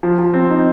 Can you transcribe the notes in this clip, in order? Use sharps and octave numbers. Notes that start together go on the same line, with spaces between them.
F3
F3
C4
D#4